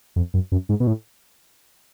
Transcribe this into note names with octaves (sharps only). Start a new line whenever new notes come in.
F2
F#2
F#2
G#2
B2
A2